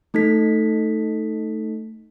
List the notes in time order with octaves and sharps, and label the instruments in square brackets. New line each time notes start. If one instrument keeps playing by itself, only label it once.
[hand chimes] A3 D#4 A4 B6